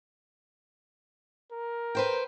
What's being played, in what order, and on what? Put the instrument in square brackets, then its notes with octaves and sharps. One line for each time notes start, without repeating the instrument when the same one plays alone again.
[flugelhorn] A#4
[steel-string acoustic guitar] B4 C5 G5